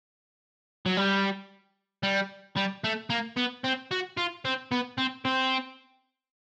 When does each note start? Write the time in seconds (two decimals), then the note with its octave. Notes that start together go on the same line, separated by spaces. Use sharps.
0.86 F#3
0.97 G3
2.03 G3
2.56 G3
2.84 A3
3.10 A#3
3.37 B3
3.64 C4
3.91 F#4
4.17 F4
4.45 C4
4.72 B3
4.98 C4
5.25 C4